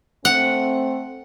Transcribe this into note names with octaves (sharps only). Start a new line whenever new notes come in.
A3 C4 F#5